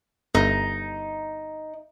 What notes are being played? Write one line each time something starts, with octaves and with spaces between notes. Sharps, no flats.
G1 D#4